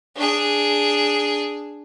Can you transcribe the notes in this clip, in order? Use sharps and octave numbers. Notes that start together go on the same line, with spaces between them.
D4 G#4